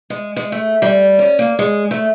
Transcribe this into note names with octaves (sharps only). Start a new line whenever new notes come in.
G#3
G#3
A3
G3
C#4
A#3
G#3
A3